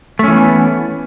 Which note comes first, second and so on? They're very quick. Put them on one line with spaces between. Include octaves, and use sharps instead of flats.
A3 C#4 E3 B3